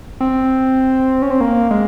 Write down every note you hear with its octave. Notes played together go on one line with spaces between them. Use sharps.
C4
C#4
C4
A#3
G#3